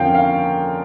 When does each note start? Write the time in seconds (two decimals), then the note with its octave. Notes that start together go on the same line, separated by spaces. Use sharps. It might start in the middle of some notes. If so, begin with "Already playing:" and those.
Already playing: F2 D3 F3 C#4 A#4 F5 G5
0.14 F5